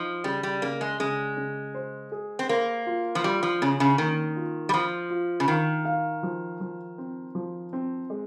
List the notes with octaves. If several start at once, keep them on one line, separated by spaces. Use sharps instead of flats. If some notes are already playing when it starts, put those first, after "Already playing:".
Already playing: F3 D#4
C#3 G3
G3
C#3 A#3
G#3
C#3 G#3
C#3
C5
G#4
C4
A#3 C5
F4
F3
G3 F4
F3
C#3 C#4
C#3
D#3 A#3
F4
G3
F3 F4
F4
C#3
D#3 F5
F5
F3
F3
C4
F3
C4
G#3